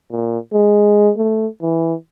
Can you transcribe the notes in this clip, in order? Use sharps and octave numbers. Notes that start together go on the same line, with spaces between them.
A#2
G#3
A3
E3